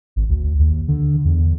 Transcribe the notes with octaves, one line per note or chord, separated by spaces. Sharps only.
G#1
D2
D#2
D3
E2